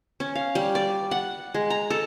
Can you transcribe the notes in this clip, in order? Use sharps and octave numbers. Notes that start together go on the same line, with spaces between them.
C#4
F5
G3
D5
F#5
G#3
A#5
A4